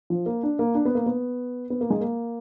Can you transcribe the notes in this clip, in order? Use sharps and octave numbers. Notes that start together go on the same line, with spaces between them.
F3
A#3
D4
A#3
D4
B3
A#3
B3
B3
A#3
G#3
A#3